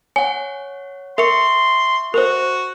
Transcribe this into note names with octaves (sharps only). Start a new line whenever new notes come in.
C#5 F#5 G#5
A#4 E5 C6 C#6 C#7
F#4 A#4 C5